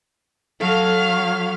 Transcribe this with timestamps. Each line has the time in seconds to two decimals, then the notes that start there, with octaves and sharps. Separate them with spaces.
0.61 F#3 A4 F5 F6